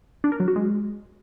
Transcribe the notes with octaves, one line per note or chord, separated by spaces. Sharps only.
D4
A#4
F#3
F#4
G#3